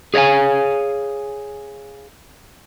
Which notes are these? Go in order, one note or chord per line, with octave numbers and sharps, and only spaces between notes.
G#4 C#5 D5 F5 G#5